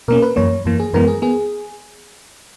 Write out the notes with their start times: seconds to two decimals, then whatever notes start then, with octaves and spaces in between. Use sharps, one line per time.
0.08 B2 A#3 C#4 A#4
0.22 B4
0.36 F#2 E3 A#3 C#5
0.65 F#2 E3 A#3
0.80 G#4
0.93 F#2 E3 G#3 B3 A#4
1.08 G#4
1.22 B3 G#4